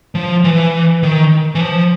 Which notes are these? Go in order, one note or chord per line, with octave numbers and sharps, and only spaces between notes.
F3
E3
D#3
E3
F3